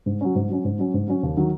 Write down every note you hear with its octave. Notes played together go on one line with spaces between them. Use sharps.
G#2
F#3 C#4
G#2
F#3 C#4
G#2
F#3 C#4
G#2
F#3 C#4
D#2
D#3 F#3